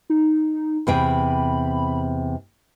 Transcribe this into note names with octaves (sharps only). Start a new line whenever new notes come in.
D#4
E2 C3 G5 B5